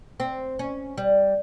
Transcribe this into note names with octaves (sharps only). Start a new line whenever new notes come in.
C4
C#4
G3